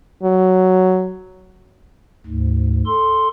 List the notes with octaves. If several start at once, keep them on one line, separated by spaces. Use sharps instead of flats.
F#3
D2 G#2
A4 C6